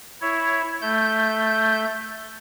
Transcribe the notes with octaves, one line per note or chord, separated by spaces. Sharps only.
E4 C#5
A3 G6